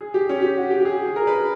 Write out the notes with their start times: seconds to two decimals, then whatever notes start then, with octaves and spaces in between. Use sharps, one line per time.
0.01 G#4
0.14 G4
0.29 C#4
0.42 G4
0.57 F#4
0.70 G4
0.80 G4
0.85 G#4
1.06 G#4
1.16 A#4
1.27 B4